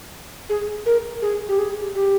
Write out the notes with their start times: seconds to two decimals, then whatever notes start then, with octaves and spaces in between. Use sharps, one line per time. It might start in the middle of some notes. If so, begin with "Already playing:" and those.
0.49 G#4
0.86 A#4
1.22 G#4
1.48 G4
1.59 G#4
1.95 G4